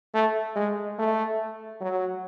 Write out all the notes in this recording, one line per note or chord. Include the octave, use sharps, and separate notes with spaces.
A3
G#3
A3
F#3